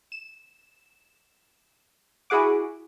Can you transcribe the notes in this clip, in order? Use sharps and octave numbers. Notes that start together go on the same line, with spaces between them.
E7
E4 F#4 G#4 F#5 D6